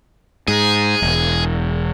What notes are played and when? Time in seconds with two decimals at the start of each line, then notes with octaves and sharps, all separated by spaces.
0.48 G#2 G#4
1.02 E1